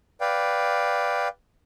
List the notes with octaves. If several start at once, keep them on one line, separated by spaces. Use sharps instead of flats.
B4 D5 F5 G5